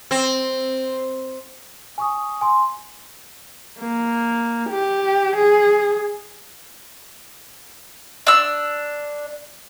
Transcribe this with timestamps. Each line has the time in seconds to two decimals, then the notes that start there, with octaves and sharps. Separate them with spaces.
0.11 C4
1.98 G#5 C#6 D#6
2.41 G#5 C6
3.79 A#3
4.69 G4
5.36 G#4
8.27 D4 E6